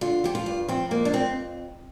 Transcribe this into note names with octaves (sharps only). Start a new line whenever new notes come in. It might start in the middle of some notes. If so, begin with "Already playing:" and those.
D3 F4
F3 G4
F4
G2
F3 C4
F2 A#3
D4
F2 C4